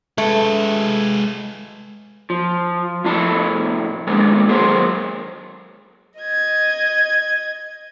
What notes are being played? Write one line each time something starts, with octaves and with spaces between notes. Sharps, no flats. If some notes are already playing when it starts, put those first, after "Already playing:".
G#3 A3 B4
F3
F2 A2 E4 A5
D3 D#3 G#3 A#3 B3
D#3 F#3 G#4 A#4 C5
D#5 G#6